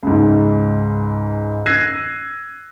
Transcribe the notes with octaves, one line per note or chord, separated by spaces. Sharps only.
C#2 G#2
E6 F#6 G#6 A#6 C7 D#7